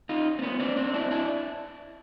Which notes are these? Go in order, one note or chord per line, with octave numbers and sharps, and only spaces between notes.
D#4 F4
C4
B3 C#4
C4 D4
C4 D4
D4 E4
D4 E4